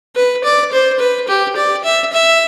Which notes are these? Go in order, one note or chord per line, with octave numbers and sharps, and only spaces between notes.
B4
D5
C5
B4
G4
D5
E5
E5